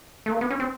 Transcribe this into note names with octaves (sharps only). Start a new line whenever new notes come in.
A3
A#3
B3
C#4
C4